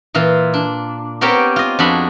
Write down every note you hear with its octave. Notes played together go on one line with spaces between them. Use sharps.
A#2 E3 F4
D4
B3 C4 G4 A#4 C#5 G5
F4 D#5
F2 D4 F#4 G#4 B5